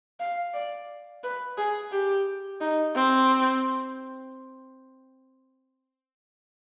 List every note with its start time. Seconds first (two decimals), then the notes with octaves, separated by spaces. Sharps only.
0.20 F5
0.54 D5
1.23 B4
1.57 G#4
1.92 G4
2.61 D#4
2.95 C4